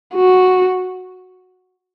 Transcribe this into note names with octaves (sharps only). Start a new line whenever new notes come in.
F#4